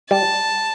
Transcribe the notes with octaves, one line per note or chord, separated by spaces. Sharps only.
G3 A5